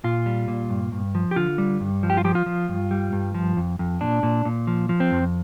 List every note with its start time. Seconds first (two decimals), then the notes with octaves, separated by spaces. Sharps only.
0.04 A#2 F4
0.26 G3
0.48 A#2
0.70 G2
0.92 G2
1.15 F3
1.31 G4
1.36 D3 F4
1.58 G3
1.80 G2
2.03 F3
2.10 G4
2.17 F4
2.24 F3 G4
2.35 F4
2.46 F3
2.69 G2
2.91 G3
3.13 G2
3.34 F3
3.57 F2
3.79 F2
4.01 A#2 D4
4.23 A#2
4.45 A#2
4.67 F3
4.89 F3
5.00 C4
5.11 F2